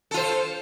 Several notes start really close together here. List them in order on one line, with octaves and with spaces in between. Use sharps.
A4 F4 C5